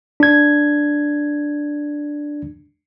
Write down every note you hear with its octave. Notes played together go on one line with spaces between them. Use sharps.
D4 G#6